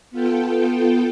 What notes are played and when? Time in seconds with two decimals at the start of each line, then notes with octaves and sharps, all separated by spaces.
0.11 B3 F4 A4 G5